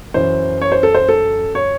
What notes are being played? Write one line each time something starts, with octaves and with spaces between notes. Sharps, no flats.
F#2 E3 C5
C#5
C5
A4
C5
A4
C#5